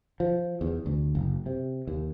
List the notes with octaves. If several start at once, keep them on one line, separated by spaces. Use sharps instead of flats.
F3
E2
D2
F#1
C3
D#2